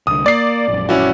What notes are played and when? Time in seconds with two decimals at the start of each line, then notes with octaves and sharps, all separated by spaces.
0.07 C2 D3 D#6
0.26 A#3 D5 C7
0.68 A#1 F#2
0.89 C#4 E4 F#4